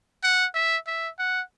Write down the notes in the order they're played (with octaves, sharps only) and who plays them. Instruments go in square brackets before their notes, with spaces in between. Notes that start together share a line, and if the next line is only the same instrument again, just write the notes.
[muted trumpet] F#5
E5
E5
F#5